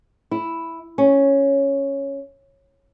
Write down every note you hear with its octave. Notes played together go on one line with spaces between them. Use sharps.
E4
C#4